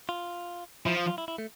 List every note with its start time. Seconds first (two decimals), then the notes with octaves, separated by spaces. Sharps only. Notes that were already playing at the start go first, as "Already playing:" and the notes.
0.09 F4
0.86 F3 E4
0.97 F4
1.07 F4
1.18 E4
1.28 E4
1.38 A3